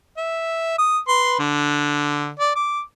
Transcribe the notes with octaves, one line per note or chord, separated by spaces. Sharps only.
E5
D#6
B4 C6
D3
D5
D6